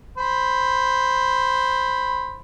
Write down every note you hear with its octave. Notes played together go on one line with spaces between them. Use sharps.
C5 B5